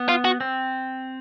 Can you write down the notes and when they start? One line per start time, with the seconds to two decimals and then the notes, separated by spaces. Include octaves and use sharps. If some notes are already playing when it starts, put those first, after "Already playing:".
Already playing: B3
0.09 F4
0.25 F#4
0.41 C4